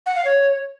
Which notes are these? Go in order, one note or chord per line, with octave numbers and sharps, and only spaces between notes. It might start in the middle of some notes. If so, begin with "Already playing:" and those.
F#5
F5
C#5